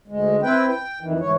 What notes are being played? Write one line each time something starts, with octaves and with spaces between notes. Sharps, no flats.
D2 G#3
C4 E4 B4 G5
G5
F2 D#3 E3
D2 G#2 E3 C#5